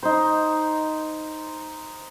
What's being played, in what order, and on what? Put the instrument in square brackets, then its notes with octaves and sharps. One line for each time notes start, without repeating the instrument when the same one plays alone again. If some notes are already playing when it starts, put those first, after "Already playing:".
[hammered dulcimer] D#4 C5